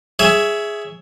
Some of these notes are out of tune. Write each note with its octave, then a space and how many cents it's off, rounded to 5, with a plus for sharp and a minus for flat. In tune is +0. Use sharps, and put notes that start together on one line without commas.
G#4 +0 C#5 +20 E5 +0